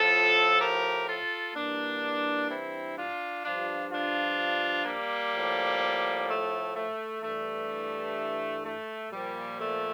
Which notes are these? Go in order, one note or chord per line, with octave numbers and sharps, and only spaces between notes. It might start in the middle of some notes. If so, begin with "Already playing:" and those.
Already playing: A2 F3 F4 A4
G4 A#4
F4 A4
G2 E3 A#3 D4
C4 E4
D4 F4
G2 F3 D4 F4
D4 F4
G3 A#3
A2 F3
A3
A3
G2 E3 A3
A3
A#2 F3 G3
A3